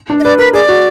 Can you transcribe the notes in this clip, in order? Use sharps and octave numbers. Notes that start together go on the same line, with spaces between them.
D4
D#5
B4 D5
A#4 B4
G#4 D5
F#4